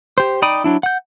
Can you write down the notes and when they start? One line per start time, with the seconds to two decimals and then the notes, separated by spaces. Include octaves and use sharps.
0.18 G4 C5
0.42 D#4 D5 G5 B5 D#6
0.64 F#3 D4 E4
0.83 F#5 G6